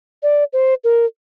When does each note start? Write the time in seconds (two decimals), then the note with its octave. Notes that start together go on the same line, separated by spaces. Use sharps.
0.23 D5
0.53 C5
0.84 A#4